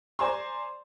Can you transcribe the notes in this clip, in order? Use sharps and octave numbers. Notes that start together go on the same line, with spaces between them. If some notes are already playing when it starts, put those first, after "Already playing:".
C5 D5 G#5 A#5 C6